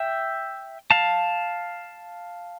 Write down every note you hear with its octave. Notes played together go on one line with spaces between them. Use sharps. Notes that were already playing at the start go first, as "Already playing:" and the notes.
Already playing: E5 G5
F5 A5